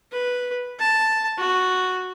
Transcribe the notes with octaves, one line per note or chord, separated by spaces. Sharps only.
B4
A5
F#4